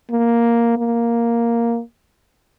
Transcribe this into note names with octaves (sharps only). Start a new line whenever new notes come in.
A#3
A#3